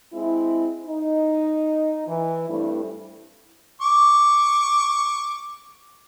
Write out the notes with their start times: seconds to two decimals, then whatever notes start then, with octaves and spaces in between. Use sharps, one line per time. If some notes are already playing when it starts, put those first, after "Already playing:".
0.13 G#3 C4 E4
0.86 D#4
2.07 E3
2.48 G2 G3 A3 C4 E4
3.82 C#6 D6